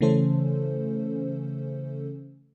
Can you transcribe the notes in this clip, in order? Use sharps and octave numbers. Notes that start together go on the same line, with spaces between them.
C#3 E3 A3 C#4 A4 C5